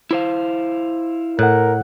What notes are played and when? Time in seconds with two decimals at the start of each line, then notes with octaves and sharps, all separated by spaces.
0.11 E4 C5 F5
1.39 A2 A#4 F#5 F#6